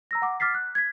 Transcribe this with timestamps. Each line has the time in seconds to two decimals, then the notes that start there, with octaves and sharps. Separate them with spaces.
0.11 A#5 E6 A#6
0.22 F#5 D6
0.40 D6 F6 A6 B6 C7
0.54 F#6
0.75 G#6 B6